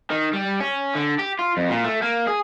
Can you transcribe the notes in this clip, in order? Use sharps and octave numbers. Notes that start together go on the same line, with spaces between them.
D#3
G3
C#4
D3
G4
F4
F2
A#2
A3
A#3
G#4